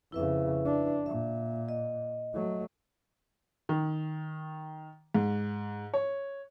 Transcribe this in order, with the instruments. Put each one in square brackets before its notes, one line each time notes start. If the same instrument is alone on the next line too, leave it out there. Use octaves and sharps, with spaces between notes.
[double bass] F2 C#3 [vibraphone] E4 B4 E5
[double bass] D4
[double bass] A#2 [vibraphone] E5
[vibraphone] D#5
[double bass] F#3 A3
[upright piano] D#3
G#2
C#5